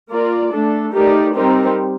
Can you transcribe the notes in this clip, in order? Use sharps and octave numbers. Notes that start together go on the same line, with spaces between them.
A#3 F4 A#4 D5
A3 D4 A4
A3 D#4 G4 A#4 D5
G3 C4 D#4 G4 A#4